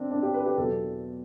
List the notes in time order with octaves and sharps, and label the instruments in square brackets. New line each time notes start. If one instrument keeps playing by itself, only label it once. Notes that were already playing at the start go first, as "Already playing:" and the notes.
Already playing: [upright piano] C4 D4
D4
G4
B4
G4
E2 B2 F#3 A4